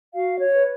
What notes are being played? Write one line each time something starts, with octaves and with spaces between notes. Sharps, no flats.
F#4 F5
C#5
B4